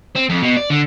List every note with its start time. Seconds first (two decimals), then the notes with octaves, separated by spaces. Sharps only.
0.15 C4
0.29 F2
0.42 B2
0.57 D5
0.70 D3